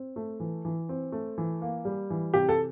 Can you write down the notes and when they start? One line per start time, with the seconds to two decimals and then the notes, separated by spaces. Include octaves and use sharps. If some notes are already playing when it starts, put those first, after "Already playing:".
Already playing: C4
0.16 A3
0.40 E3
0.65 E3
0.89 C4
1.12 A3
1.38 E3
1.62 A#3
1.85 G3
2.10 E3
2.34 C3 G4
2.49 A4